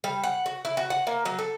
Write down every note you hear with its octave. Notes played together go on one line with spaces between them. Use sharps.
G3
F#5
F#4
E4
F#4
F#5
A#3
F#3
A4